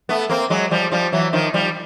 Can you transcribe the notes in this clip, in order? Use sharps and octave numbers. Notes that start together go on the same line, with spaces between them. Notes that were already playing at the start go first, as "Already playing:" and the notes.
A3 B3
A#3 C4
F#3 G#3
F3 G3
F3 G3
E3 F#3
D#3 F3
F3 G3